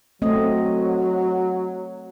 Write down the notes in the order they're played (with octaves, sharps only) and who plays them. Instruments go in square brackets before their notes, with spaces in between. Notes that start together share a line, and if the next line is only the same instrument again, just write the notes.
[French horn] F#3 [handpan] A3 C4 D#5